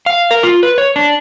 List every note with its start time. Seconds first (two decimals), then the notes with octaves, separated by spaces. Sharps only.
0.06 F5
0.31 A#4
0.43 F4
0.63 B4
0.78 C#5
0.96 D4